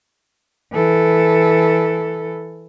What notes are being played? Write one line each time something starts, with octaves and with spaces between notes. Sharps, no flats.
E3 A4